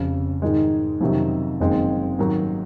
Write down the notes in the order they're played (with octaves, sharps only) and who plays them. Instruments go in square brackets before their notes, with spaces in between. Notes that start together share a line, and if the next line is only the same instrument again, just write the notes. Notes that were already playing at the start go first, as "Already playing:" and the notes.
Already playing: [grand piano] F1 F2 C#3
G#2 D#3 G#3
F2 C3 D#3 F#3 C#4
F#1 F#2 D#3 G#3 C4
G#2 D#3 F#3 A#3